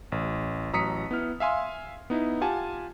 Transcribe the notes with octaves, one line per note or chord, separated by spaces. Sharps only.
A1
A1 F#3 A#5 D#6 B6 C#7
B3 E4 F6
E5 F5 G#5 C6
B3 D#4 E4
F4 G4 F#5 G#5 A5